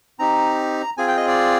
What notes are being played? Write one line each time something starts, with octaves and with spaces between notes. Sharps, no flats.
C4 D#4 G4 A#5
C4 F4 G#4 G#5
G5
D#5
D5